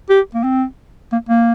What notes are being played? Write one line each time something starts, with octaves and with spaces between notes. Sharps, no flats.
G4
A#3
C4
A#3
A#3